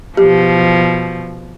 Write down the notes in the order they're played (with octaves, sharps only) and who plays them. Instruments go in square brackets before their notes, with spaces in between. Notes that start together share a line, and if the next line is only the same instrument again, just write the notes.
[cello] B2 F3 [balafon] G4